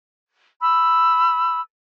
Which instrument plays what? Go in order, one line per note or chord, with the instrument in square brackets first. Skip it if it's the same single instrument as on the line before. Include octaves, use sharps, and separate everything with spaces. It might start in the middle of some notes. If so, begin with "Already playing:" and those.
[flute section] B5 E6